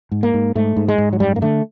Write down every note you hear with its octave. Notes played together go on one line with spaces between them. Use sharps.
G#2
A#3
G#2
G#2 A3
G#2
G#3
G#2
F#3
F#2 G3
A#3
D3 A3